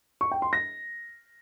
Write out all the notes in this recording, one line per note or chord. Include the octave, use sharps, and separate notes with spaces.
C#6
G5
C6
A#6